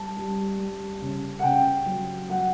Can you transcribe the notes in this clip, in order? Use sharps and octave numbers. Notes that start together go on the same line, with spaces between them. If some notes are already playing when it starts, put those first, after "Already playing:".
Already playing: G3 A5
G3
G3
C#3
F#5
C#3 G5
F#3
F#3 F#5